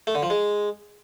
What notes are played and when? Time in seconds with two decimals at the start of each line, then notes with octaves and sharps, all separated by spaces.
0.07 A3
0.15 D3
0.23 F3
0.30 G#3